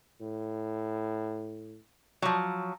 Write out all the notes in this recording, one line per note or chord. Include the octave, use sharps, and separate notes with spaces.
A2
F3 F#3